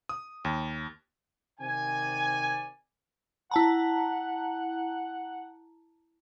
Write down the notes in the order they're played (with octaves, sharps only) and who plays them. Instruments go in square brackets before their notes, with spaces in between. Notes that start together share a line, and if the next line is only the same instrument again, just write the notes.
[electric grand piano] D#6
D#2
[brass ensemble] C3 D#3 D5 G#5
[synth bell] E4 A5 A#5 [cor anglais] F#5